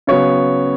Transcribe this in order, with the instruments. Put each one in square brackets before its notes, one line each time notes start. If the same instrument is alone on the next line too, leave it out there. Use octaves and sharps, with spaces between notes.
[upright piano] C#3 F#3 B3 C#5